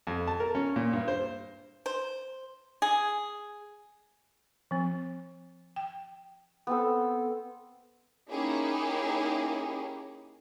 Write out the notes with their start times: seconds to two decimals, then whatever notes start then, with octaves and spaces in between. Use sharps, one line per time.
0.07 F2
0.27 A5
0.40 A#4
0.55 C#4
0.76 A#2
0.93 G2
1.08 C5
1.86 C5
2.82 G#4
4.71 F3 C4
5.76 G5
6.67 B3 C4 A4
8.30 A#3 C#4 D#4 E4 G4 G#4